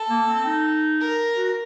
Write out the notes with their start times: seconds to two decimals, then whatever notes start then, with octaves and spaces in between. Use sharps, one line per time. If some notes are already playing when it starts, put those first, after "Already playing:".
Already playing: A4
0.09 A#3
0.28 C4
0.46 D#4
1.00 A#4
1.37 F#4